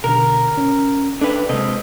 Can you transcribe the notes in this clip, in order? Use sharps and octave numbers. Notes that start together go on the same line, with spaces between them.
B2 D3 A#4
C#4
D4 A4 B4
C3 G#3 C4 D#5